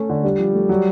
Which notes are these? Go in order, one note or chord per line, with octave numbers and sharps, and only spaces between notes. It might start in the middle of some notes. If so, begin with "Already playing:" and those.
Already playing: A3 C#4
D3
G3 D4
F3
A3
F#3